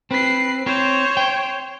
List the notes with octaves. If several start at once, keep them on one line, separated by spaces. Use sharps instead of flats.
C4 B4 C7
C4 C5 C#5
G5